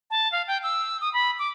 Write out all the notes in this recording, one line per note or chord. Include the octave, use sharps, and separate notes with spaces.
A5
F5
G5
E6
D#6
B5
D6